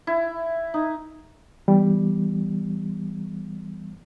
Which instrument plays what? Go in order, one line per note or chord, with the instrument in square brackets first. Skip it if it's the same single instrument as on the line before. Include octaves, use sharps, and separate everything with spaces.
[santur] E4
D#4
[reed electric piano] E3 G3 B3